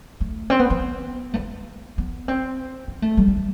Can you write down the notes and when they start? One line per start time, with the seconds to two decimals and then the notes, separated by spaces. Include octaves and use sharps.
0.20 A3
0.50 C4
0.59 B3
0.70 B3
1.34 A3
1.38 B3
1.98 B3
2.28 C4
2.88 B3
3.02 A3
3.17 G3
3.28 B3
3.37 A3